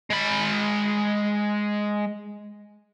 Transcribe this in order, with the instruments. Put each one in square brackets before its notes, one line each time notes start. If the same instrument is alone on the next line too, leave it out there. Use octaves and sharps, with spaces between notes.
[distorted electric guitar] G#3 B5